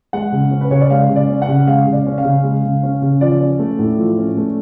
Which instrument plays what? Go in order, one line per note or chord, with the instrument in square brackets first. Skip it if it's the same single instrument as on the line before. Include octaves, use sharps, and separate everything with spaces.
[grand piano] G#3 F#5
C#3
C#4
B4
C#3 C#5
D5
G#3 F5
C#3
D5
C#4
F#5
C#3
G#3 F5
C#3
D5
C#4
F5
C#3
G#3
C#3
C#4
C#3
F3 D5
C#4
A3
A2
F3
C#4
A3